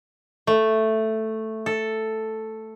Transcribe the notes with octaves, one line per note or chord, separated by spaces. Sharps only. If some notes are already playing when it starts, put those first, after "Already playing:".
A3
A4